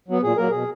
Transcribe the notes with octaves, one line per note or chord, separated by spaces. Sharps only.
F#3 B3
A#2 G#4
F#3 A#3 A#4
B2 G#4